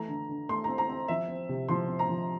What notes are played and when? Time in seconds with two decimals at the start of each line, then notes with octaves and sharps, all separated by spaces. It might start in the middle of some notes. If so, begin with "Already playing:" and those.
Already playing: E3 A3 A#5
0.08 D3
0.29 D3
0.49 A3 C6
0.64 C4 A#5
0.78 A#5
0.89 C4
1.08 F3 E5
1.28 C4
1.49 C3
1.69 F3 C6
1.89 C4
1.99 A#5
2.09 F3